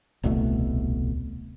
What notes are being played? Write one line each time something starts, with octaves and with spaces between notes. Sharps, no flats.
D#1 C2 B2 A3